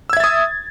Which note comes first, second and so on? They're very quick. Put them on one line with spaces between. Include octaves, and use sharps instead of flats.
E6 G#6 E5 A6 D#6